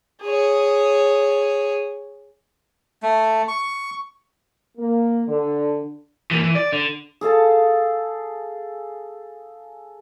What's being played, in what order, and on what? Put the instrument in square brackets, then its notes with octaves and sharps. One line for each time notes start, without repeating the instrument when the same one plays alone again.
[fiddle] G#4 C#5
[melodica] A3
C#6
[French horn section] A#3
D3
[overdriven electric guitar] E3 A#3
E3
D5
D3
[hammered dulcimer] G#4 A4 F5 A5